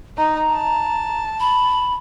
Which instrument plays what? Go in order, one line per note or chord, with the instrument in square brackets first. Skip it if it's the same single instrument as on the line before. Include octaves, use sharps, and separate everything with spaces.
[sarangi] D#4 [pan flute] A#5
[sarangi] A5
[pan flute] B5